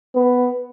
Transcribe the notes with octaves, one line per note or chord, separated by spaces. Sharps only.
B3